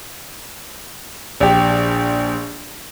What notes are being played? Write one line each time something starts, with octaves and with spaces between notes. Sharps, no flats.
A#1 G4